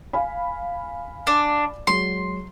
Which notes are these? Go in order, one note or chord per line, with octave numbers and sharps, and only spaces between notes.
F5 G#5 B5
D4
F#3 G#3 C6